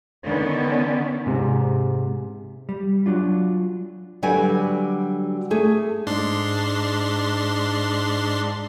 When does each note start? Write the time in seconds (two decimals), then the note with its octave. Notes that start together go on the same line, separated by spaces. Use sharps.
0.25 D3 D#3 B3 C#4
1.26 G#2 C3
2.69 G3
3.06 F#3 D4 F4
4.23 D3 F#3 G3 F#4 B4 G#5
5.51 A3 G#4
6.07 G#2 D4 C6